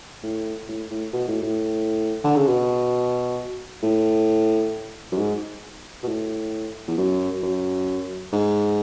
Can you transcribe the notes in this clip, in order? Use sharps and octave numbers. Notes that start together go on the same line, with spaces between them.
A2
A2
A2
B2
A2
A2
D3
C#3
B2
A2
F#2
G#2
B2
A2
E2
F#2
F#2
G#2